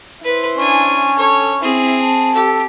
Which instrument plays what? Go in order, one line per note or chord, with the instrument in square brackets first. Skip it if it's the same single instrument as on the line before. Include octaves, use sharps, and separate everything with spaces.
[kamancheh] E4 C5 [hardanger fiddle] B4
[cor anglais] C#4 [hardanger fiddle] D4 G#5
[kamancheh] A4 [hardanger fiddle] C#5
[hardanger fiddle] C4 G#4 [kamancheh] E4
[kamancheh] A5
[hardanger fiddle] G4 [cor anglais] A4